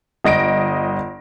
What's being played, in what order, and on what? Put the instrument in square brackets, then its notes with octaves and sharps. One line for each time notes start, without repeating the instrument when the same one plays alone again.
[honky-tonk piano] G1 D#5 A#6 D7